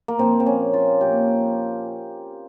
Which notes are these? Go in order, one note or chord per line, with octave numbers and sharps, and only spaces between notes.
A#3
A#2 F3 C4
C4
C#4
F4
A#2 F3 G4